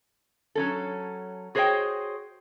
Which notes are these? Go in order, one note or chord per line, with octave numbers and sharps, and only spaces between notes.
F#3 C#4 A4
F#4 G#4 C5 C#5 D#5 G5